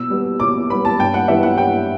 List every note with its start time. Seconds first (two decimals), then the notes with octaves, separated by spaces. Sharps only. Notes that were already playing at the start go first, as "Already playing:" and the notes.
Already playing: B2 E6
0.10 G3 B3
0.40 B2 D6
0.70 G3 B3 B5
0.85 A5
0.99 G2 G5
1.14 F#5
1.28 E3 G3 B3 E5
1.43 F#5
1.58 G2 G5